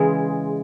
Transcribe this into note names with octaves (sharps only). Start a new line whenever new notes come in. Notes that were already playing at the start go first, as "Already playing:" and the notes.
Already playing: C#3 E3 G#3 G#4